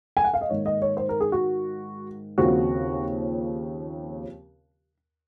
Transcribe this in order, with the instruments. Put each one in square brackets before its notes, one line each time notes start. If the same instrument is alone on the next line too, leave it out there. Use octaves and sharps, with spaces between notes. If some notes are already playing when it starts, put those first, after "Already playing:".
[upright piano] G#5
F#5
F5
D#5
G#2 D#3 A#3 C#5
D#5
C#5
C5
A#4
G#4
F#4
D#2 C#3 F3 C4 F#4